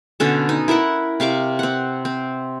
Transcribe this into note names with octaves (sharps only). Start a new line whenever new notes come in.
B2 D3 C#4 A4
D#4
E4 A#4 E5 F#5
C3 F5 C#6 D6
C4 F#5
C4